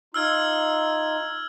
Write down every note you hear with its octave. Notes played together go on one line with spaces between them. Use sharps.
D#4 F4 E6 F6 G#6